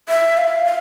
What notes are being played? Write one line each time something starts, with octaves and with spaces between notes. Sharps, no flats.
E5
F5
F5